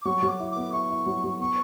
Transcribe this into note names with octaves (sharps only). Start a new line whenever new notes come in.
D6
F#3 C#6
F#3
D6
E4
D6
B3
E4 C#6
E4
F#3
F#3
B3 C#6